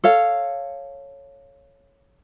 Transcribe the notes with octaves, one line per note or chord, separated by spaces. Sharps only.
A4 C#5 F5